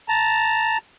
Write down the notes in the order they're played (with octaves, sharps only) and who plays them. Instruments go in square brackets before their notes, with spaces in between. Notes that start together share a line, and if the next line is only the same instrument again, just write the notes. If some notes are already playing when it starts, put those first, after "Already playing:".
[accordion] A5 A#5